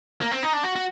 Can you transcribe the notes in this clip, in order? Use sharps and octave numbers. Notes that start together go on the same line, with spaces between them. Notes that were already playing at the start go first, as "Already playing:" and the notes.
A#3
C4
D#4
D4
F#4
F#4